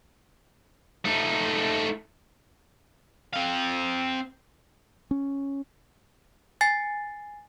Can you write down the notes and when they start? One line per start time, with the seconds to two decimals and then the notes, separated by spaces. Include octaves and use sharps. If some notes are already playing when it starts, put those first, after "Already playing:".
1.05 A3 D#4
3.34 C4 F5
5.11 C#4
6.61 G#5 A6 C7